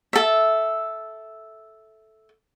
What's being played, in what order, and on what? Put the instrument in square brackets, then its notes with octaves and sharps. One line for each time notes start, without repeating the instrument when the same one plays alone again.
[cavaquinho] A4 E5